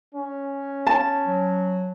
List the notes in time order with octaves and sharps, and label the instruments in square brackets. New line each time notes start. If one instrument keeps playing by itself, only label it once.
[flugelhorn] C#4
[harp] A5
[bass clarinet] F#3